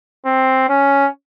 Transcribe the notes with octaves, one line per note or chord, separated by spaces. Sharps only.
C4
C#4